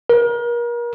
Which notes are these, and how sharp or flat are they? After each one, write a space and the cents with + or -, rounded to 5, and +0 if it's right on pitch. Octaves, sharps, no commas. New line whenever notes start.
A#4 +35